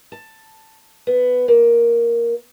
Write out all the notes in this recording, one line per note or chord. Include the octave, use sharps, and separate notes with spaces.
A5
B3
A#3